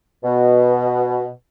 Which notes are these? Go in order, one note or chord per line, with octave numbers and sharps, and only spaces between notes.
B2